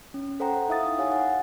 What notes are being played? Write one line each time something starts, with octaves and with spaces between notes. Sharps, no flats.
C#4
A4 C5 F#5 G5 A#5
D#4 E4 E5 F5 D#6 A6
G4 C#5 F5 F#5 G#5
F#5